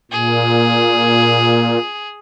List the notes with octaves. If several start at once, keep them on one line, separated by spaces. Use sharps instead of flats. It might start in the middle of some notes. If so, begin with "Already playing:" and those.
A#2 G#4